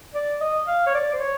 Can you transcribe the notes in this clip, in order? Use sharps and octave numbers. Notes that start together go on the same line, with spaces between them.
D5
D#5
F5
C#5
D5
C5
C#5